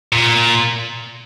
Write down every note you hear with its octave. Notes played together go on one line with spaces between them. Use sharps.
A#2